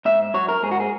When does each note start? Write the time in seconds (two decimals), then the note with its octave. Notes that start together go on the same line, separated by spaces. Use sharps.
0.05 G#2 E5
0.34 F#3 C#5
0.48 A#4
0.63 G#2 G#4
0.71 F#4
0.80 G#4